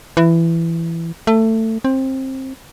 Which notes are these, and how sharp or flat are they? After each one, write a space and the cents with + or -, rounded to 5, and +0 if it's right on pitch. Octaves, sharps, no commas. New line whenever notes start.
E3 +15
A3 +20
C4 +20